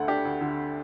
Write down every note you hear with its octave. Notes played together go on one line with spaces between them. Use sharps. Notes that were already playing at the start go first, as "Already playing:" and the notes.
Already playing: D2 D3 A3 F#5
D4 G4
D2
D3